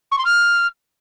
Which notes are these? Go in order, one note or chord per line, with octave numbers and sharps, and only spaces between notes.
C#6
C6
F6